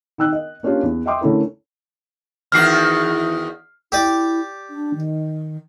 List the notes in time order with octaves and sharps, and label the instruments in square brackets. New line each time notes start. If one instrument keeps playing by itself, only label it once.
[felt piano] D#3 G5 E6 F#6
D#5
A#3 C#4 D4 F4 G4
E2
D#5 E5 G5 C6 D6 D#6
D3 A3 C#4 E4 A#4
[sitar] E2 D#3 F#4 [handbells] F6 C7
[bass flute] E4 [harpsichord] G4 D5
[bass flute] D4
D#3